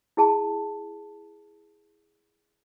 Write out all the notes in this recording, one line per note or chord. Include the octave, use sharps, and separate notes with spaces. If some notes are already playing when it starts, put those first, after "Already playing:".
E4 G#4 A5